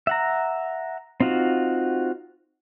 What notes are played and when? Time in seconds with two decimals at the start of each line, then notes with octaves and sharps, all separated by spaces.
0.07 E5 F#5 A#5
1.20 C4 D#4 F4 F#4